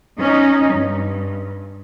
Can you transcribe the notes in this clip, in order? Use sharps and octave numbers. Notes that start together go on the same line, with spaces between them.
C#4 D#4
G2